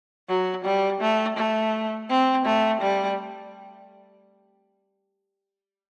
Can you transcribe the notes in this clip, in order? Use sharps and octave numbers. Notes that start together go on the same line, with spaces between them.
F#3
G3
A3
A3
C4
A3
G3